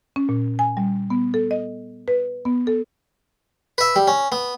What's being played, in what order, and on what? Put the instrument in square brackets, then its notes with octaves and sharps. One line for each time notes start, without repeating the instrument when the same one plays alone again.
[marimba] C#4
A#2
G#5
G3
B3
A4
D#5
B4
B3
A4
[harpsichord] B4 E5
G3
C#4
B3